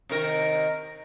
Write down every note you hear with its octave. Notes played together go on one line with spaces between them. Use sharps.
C3 D#3 A#4